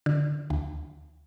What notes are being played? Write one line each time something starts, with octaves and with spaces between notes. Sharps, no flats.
D3
D2